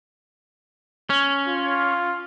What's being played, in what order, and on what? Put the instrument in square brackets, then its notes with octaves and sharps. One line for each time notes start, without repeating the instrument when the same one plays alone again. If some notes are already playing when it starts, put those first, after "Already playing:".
[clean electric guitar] C#4
[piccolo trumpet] F4